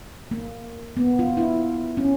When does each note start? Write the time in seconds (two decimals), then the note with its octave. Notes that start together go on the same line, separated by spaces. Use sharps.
0.31 A#3
0.97 B3
1.19 F4
1.37 E4
1.97 C#4